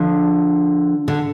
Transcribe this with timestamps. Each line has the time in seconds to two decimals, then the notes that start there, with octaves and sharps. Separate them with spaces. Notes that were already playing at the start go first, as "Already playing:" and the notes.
Already playing: D3 F3
1.08 D3